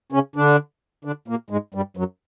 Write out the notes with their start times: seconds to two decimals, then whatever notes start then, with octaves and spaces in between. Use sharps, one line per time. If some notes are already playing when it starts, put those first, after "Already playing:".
0.12 C#3 C#4
0.36 D3 D4
1.05 D3 D4
1.28 A#2 A#3
1.50 G#2 G#3
1.74 G2 G3
1.97 F#2 F#3